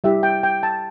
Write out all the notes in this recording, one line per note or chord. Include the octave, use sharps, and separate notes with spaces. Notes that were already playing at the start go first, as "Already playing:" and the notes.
G3 E4 G4 E5
G5
G5
A5